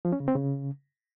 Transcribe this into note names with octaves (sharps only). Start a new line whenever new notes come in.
F3
C#4
C#3
C4
C#3